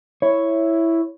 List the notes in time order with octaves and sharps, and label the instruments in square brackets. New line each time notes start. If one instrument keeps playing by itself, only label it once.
[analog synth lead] E4 [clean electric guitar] C#5